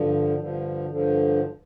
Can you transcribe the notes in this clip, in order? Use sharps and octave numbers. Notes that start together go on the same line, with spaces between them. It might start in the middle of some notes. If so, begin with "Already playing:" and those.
Already playing: G2 D3 F3
G2 D3 F3
G2 D3 F3